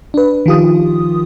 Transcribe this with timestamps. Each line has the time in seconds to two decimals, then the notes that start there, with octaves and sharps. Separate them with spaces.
0.14 D4 B4
0.46 D#3 F3 F4 G4 D#6